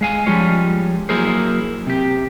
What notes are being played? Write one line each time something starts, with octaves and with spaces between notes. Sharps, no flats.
G#3 F5 G#5
F3 G3 G#3 C#4 F4 C#5
F#3 A#3 E4 G#4 A#4 C5
C3 G4